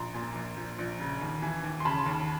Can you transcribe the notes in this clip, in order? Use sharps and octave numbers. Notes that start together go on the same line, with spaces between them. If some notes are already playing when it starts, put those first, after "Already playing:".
Already playing: A#1 A#5 C6
A#2
A#1
F3
A#1
C#3
D#2
E3
D#2
C6
C#3 A5 B5
D#2